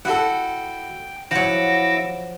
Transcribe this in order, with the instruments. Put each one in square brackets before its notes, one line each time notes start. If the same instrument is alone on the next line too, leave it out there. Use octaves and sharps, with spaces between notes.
[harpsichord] E4 F#4 A4 [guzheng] F#5 [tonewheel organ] G5
[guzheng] F3 F#3 [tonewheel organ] E4 D6 E6 [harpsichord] F#5 C#6 [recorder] A#6